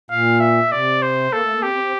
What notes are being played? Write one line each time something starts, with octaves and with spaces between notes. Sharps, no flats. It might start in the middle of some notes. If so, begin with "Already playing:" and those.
A#2 F5
E5
A#2
C3 D5
C5
A#3 A4
A3
A#3
C4 G4
C4
C4